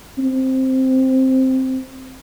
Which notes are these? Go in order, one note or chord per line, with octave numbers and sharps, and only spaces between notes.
C4